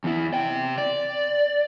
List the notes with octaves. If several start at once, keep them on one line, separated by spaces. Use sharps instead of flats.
E2 E4
C3 G5
D5